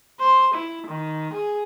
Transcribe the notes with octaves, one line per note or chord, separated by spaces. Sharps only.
C5
E4
D#3
G#4